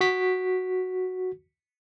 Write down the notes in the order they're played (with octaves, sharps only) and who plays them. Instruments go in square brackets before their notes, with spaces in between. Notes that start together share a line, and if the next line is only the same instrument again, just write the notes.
[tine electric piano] F#4 B6